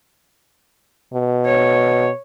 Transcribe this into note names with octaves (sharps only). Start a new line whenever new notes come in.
B2
C#5